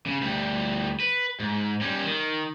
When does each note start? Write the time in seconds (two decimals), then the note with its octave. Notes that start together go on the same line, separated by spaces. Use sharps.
0.06 C#3
0.21 D2 G3
1.00 B4
1.40 G#2
1.81 G3 C#4
2.04 D#3